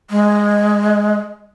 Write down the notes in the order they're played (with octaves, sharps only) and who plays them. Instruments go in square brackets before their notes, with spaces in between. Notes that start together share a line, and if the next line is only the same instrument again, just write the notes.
[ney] G#3